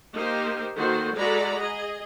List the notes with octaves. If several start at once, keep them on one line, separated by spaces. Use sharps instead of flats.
A#3 D#4 G4 C5
D#3 A#3 F#4 A4 C5
G#3 F#4 A4 D5 A#5 B5
G#4 D#5